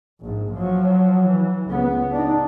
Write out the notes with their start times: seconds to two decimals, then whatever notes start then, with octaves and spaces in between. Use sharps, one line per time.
0.21 A#1 G#2
0.53 F3 F#3
1.28 E3
1.68 C#2 B3
2.12 D4 D#4